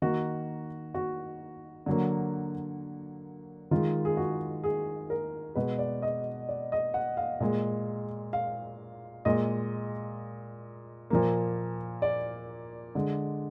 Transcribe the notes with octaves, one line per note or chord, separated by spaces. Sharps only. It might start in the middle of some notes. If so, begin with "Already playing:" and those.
D#3 A#3 F#4
F#4
D3 F#3 A#3
D#3 G#3 F4
G#4
F#4
G#4
A#4
B2 G#3 B4
D5
D#5
D5
D#5
F#5
F5
A#2 G#3
F5
A#2 G#3 D#5
A#2 F3 A#3
D5
D3 G#3